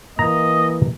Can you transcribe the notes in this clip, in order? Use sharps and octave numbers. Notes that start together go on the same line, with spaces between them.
E3 A#3 D#5 A#5